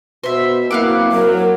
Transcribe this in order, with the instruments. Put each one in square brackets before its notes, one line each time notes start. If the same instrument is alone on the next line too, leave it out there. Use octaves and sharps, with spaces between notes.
[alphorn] B2 [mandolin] C5 E5
[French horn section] F#3 C4 E4 [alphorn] A#3 [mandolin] F5 F#5 D6
[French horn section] F#3 [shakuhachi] A#4